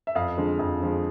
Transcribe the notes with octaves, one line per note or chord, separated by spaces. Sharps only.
E5
F2 F5
D3 F3 G#3
F2
D3 F3 G#3